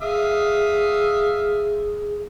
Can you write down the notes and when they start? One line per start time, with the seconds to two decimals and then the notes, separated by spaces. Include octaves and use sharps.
0.02 G#4 E5 F5 D#6